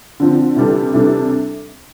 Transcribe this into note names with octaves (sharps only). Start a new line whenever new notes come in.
D3 F3 C4
C3 E3 G3 D4 A4
C3 E3 G3 D4 A4